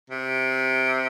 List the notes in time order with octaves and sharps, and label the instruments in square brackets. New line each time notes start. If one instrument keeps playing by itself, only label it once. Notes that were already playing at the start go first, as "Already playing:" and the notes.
[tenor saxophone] C3